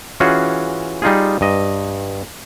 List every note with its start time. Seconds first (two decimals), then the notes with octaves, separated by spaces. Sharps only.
0.20 E3 C#4 F4 F#4 G#4
1.02 G3 D#4 F4 G#4
1.41 G2 D#5